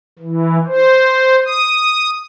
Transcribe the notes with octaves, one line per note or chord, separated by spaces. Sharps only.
E3
C5
D#6